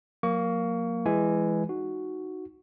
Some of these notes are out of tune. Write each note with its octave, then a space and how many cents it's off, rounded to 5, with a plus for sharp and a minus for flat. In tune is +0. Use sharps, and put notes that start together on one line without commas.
F#3 -35 A#3 +0 C#6 +30
E3 +15 G#3 +0 G#5 +0
D#4 +0 F#4 +0